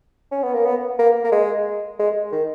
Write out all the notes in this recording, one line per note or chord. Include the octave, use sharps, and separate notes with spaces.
C#4
B3
A#3
B3
A#3
A#3
G#3
G#3
D#3